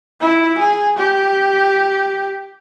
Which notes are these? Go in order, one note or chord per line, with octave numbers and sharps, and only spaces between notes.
E4
G#4
G4